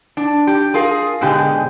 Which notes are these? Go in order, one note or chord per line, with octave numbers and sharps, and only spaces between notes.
D4
G4
F4 G#4 A#4 F5
G#2 B2 D3 G4 G#4